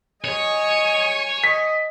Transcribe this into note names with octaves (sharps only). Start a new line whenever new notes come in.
C#5 D#5 G#5 C#6
D#5 B6